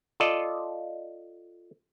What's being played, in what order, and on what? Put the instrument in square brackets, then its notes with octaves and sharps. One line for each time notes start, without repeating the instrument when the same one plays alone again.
[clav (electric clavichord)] F4 A4 D5 D#5